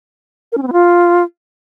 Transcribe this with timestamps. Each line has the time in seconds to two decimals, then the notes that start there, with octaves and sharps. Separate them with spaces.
0.52 A#4
0.57 C#4
0.62 C4
0.67 B3
0.73 F4